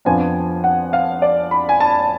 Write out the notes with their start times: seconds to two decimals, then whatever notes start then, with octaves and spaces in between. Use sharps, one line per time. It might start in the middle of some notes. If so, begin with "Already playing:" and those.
0.05 F2 F3 B3 D4 G#5
0.64 F#5
0.93 F5
1.22 D5
1.51 B5
1.69 G#5
1.80 A5